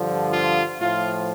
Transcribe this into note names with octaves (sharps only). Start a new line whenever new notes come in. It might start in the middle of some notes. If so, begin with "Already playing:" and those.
Already playing: G2 D3 F3
F4
A2 F3 F4